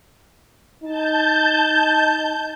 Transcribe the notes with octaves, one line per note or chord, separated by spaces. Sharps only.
D#4 A5 G6